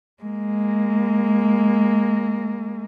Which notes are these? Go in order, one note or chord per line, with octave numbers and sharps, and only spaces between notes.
G#3 A#3